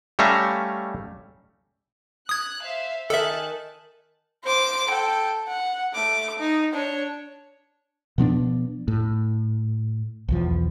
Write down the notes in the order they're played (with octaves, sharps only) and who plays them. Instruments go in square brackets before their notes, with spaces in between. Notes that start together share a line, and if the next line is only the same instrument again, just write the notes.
[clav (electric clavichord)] G3 A3 C#4 E5 F5 A#5
[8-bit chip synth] D#6 G#6 [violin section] F#6
[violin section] C5 E5 F5
[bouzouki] D#3 [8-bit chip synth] A4 E5 [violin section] G#5 A5 F#6
[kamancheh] C5 D6
A4 G5
F#5
A3 D6
D#4
D4 C#5
[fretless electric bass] B2 F3 B3 D4
A2
B1 E2 F3